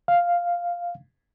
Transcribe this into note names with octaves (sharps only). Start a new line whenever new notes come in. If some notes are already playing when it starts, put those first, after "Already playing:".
F5